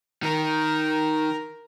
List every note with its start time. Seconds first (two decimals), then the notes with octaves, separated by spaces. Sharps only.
0.23 D#3 A#4